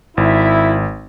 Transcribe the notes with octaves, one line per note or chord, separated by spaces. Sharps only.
G#1 E4